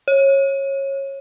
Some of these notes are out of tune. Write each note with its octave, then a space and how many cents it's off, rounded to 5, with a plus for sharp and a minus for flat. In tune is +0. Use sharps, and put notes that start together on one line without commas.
C#5 -20